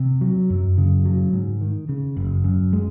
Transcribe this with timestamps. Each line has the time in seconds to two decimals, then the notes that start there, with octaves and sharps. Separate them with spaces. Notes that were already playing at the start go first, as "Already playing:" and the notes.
Already playing: C3
0.21 F#3
0.50 F#2
0.77 C#3
1.05 F#3
1.33 G#2
1.61 D#3
1.89 C#3
2.17 F#1
2.44 F#2
2.73 G#3